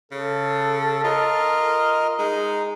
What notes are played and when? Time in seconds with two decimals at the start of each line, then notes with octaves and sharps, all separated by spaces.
0.12 C#3 A4
1.04 F4 A#4 D#5
2.19 G#3 D#4